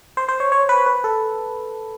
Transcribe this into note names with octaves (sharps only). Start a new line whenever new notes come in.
C5
C5
C#5
C#5
B4
B4
A4